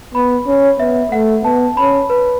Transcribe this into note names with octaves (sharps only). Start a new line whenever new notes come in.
B3 B5
C#4
B3 E5
A3 F#5
B3 A5
C#4 B5
B4